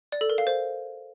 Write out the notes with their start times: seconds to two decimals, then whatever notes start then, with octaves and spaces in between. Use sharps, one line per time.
0.12 D5
0.21 A4
0.30 A#4
0.38 F5
0.47 C5